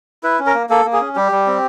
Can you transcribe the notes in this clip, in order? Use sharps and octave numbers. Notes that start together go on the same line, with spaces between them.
E4 B4
C#4
A#4
A#3
A#3 A4
A#3
G#4
C#4
G3 G4
G3
C4